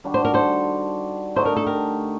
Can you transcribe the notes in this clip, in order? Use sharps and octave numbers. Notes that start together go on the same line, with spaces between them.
D#3 G3 D4 F#4
C5
A#4
A4 C5
D3 A3 D#4 C5
A#4
A4
G4 A#4